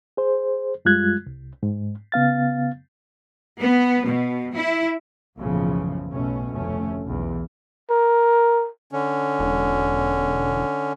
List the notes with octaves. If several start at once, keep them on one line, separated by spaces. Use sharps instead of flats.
G#4 C5
F#2 G3 G#3 F4 F#6 G#6
C2
G#2
C#3 B3 F5 A6
B3
B2
E4
F#1 B1 A2 C#3 E3 F3
B1 B2 A3 C#4
F1 D2 A3 C#4
B1 E2
A#4
D3 C#4
E1